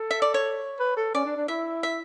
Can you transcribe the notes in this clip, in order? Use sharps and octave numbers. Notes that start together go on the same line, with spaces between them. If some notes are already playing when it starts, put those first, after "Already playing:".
Already playing: A4
E5
D5
C#5
B4
A4
C#4 D5
D4
D4
E4 E5
E5